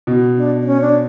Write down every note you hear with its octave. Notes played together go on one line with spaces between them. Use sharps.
B2
D4
D4
C#4
D4